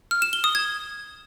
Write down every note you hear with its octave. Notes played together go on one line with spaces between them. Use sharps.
F6
E7
G7
D#6
G#6